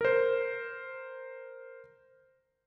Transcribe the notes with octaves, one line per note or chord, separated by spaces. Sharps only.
A#4 C5